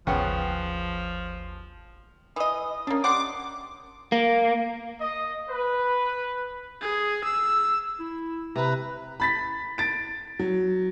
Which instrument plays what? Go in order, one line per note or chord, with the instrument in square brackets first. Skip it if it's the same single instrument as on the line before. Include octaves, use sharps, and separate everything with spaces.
[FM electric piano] G#1 D#2 [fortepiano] C#3 B3 F#5 [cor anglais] F3 [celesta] G5
[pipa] E3 D#5 [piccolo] D#6
[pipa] A#3 D4 [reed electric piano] C#4
[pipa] G3 F#5 C6 [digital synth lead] D6
[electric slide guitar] A#3
[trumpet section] D#5
B4
[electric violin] G#4
E6
[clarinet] E4
[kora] C3 [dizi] B4 [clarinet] A#5
[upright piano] B5 A6 B6
A6 D7
F#3